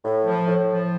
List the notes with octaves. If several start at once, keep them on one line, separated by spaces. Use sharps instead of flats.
A2
F3
A2
F3